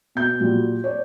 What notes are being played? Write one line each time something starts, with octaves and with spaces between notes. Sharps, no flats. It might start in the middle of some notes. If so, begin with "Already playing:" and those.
B2 G6
A#2 F#3 G3
C#5 D5